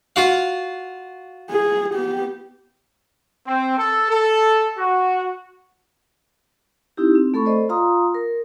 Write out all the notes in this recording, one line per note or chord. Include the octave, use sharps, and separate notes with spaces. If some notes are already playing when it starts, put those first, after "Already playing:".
F4 F#4 F5
G#4
B3 G4
C4
A4
A4
F#4
C4 D#4 E4 G4
C4
A3 A4 B5 C#6
A4 C5 D5 D#5
F4 F5 A#5 C6 D#6
A#4